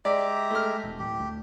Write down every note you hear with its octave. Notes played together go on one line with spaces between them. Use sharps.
G#3 G4 D5 E5 A#5
A3 F6
E1
D1 G4
D2